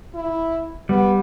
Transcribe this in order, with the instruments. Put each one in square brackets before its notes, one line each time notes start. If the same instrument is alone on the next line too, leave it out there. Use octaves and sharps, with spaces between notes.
[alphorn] E4
[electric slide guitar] G3 [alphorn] B3